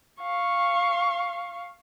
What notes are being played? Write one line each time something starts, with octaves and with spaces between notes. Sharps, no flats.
F5 C#6